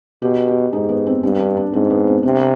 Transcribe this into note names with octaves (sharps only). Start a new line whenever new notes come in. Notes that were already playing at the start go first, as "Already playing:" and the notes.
B2 G4
G4
G#2 D#4
B3
C4
G2 C4
D4
D4
G#2 C4
B3
C4
C3 D4